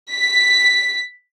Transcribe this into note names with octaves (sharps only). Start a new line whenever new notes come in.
B6